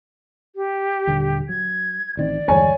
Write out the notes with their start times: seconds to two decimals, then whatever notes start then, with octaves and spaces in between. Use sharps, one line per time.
0.56 G4
1.07 D#1 D3
1.49 F#3 G#6
2.17 A1 D#3 C4 D5
2.48 G1 E2 G#3 C#5 G#5